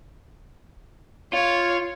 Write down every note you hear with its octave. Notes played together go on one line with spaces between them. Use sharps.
F4 C#5